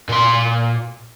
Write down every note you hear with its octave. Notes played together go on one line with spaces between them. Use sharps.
A#2 C6